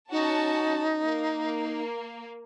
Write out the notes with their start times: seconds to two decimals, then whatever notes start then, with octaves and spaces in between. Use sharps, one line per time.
0.11 C#4 D#4 F#4 A5
1.03 A#3